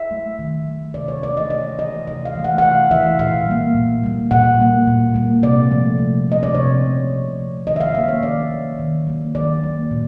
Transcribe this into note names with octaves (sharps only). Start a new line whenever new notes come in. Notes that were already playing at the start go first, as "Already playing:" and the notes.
Already playing: E5
F#3 A3
D#3
F#3 A3
C3 D5
C#5
E3 A3 D5
D#5
C3 D#5
E3 A3 D#5
C3 D#5
F5
E3 A3
F#5
F#5
C3 F5
E3 A3 E5
A#2 F5
G3 A#3
A#2
G3 A#3
A#2 F#5
G3 A#3
A#2
G3 A#3
C3 D5
F3 A3
C3
F3 A3 D#5
D5
C3 C#5
F3 A3
C3
F3 A3
D#3 D#5
E5
F5
F#3 A#3 E5
C#5
D#3 D5
F#3 A#3
D#3
F#3 A#3
D#3 D5
F#3 A#3
A#2